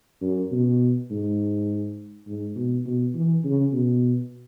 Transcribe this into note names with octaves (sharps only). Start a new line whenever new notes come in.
F#2
B2
G#2
G#2
B2
B2
E3
C#3
B2